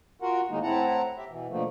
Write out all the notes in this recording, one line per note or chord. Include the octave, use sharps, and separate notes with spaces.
F4 F#4 A#4 F#5
A2 D#3 G#3 A#3 D#4
A2 C4 E4 F#5 A5 A#5
G4 E5
B2 E3
B2 D3 F3 A3 A#3